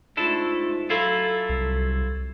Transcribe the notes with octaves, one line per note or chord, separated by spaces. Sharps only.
G#2 A3 D4 E4 F4 A4
F#3 E4 F4 A4
C2